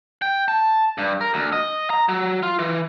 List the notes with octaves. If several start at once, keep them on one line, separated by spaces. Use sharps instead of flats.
G5
A5
G2
A#4
D2
D#5
A#5
F#3
F4
E3